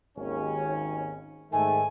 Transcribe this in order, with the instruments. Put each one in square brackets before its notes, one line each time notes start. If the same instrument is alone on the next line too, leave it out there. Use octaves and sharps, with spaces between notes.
[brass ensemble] G#1 D#2 C#4
[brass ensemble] G#2 D#3 A3 [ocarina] G#5